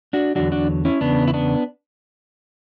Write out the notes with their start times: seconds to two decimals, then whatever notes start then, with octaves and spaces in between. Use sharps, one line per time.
0.13 D4 F#4
0.35 E2 D3 F#3 D4 F#4
0.52 D4 F#4
0.85 C#4 E4
1.01 E2 C#3 B3 D4
1.28 E4
1.34 B3 D4